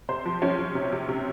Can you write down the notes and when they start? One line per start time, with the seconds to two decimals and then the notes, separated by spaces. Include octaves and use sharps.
0.09 C3 C5
0.26 F3
0.42 F3 C#4
0.58 F3
0.75 C3
0.93 C3
1.09 C3